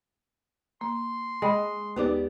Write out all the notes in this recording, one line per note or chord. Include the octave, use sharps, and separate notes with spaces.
A#3 C6
G#3 D#5 G5 B5
D#2 B3 D#4 G4 D5 D6